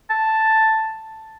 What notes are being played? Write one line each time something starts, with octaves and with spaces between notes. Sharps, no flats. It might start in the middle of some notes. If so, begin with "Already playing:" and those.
A5